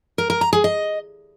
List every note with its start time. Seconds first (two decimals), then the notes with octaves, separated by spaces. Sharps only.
0.18 A#4
0.30 A#4
0.41 A#5
0.53 G#4
0.64 D#5